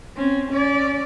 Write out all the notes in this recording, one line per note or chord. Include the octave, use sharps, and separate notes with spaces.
C4 C#4
C#4 D5